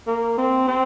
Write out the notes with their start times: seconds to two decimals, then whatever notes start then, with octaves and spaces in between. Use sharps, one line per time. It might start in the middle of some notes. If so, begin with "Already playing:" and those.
0.07 A#3
0.38 C4
0.68 C4